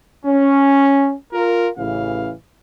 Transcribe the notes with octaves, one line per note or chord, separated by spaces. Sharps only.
C#4
F4 A#4
A1 C#3 E3 F5